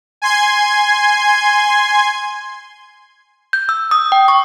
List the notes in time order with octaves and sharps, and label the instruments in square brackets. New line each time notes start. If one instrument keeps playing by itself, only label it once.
[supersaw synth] G#5 C6 G#6
[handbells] G6
E6
D#6
G5
C#6